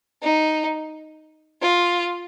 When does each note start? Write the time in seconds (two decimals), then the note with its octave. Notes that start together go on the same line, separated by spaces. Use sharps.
0.23 D#4
1.61 F4